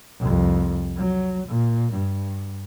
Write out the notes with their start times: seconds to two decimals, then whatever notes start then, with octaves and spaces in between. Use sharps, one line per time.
0.19 C2 F2
0.97 F#3
1.48 A#2
1.93 G2